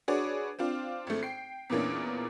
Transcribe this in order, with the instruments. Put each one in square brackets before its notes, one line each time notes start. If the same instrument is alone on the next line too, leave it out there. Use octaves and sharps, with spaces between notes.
[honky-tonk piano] D4 F#4 G#4 B4 C#5 D5
C4 D4 F4
G#1 A3
G5 C7
E2 A#2 E3 A#3 C#4 D4